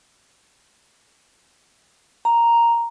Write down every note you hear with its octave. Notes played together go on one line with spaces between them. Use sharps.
A#5